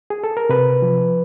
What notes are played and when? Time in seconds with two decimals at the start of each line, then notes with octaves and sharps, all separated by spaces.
0.10 G#4
0.24 A4
0.37 A#4
0.49 C3 B4
0.82 F3